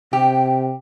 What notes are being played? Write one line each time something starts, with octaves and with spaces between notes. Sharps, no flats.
C3 G4 G5